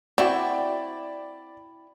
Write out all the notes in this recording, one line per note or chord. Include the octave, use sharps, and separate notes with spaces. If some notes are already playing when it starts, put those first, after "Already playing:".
C4 E4 F#4 D5 G5